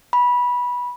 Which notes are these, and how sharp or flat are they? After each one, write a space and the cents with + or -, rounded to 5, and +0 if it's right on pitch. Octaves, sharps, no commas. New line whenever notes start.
B5 -15